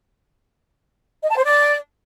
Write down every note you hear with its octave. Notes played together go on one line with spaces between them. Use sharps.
D#5
A5
C5
D5